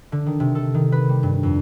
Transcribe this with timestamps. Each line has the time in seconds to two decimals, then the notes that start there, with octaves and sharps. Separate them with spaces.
0.12 D3
0.26 D#3
0.40 C3
0.55 A4
0.74 D#3
0.92 B4
1.09 G3
1.23 G2
1.43 F2